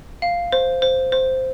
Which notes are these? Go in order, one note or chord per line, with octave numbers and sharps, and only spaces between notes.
F5
C5
C5
C5